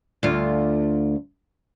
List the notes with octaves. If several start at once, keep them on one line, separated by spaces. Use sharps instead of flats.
D2 F4